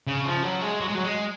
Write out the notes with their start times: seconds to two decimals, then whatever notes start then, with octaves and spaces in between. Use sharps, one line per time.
0.07 C#3
0.25 F3
0.43 F#3
0.62 G#3
0.80 F#3
0.88 G#3
0.95 F#3
1.04 G#3